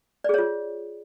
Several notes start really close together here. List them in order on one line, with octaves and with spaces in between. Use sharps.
D5 G#4 C#5 F4